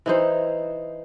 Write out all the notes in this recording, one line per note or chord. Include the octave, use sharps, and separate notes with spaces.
E3 D#4 C5